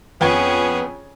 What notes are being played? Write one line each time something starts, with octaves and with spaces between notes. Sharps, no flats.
F2 B3 C#4 G#4 B4 G5 G#6